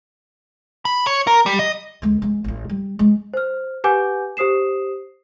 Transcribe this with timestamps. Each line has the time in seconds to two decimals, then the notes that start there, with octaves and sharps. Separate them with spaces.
0.85 B5
1.07 C#5
1.27 A#4
1.46 G3
1.59 D#5
2.02 D2 G#3
2.22 G#3 B3
2.44 A1 F4
2.69 G3
2.99 G#3
3.34 C5 F6
3.84 G4 B4 F#5 G#5 D6 G6
4.37 G4 C5 D#6 C7 E7